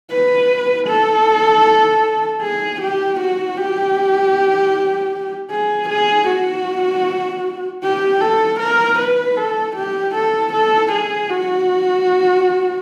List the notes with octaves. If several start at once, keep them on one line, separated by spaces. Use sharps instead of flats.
B4
A4
G#4
G4
F#4
G4
G#4
G#4
F#4
G4
A4
A#4
B4
A4
G4
A4
A4
G#4
F#4